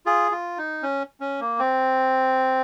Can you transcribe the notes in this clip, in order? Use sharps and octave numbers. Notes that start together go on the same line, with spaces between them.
F4 G#4
F4
D#4
C#4
C#4
A#3
C4